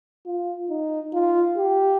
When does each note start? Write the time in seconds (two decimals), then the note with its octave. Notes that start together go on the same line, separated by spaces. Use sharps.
0.26 F4
0.70 D#4
1.13 F4
1.57 G4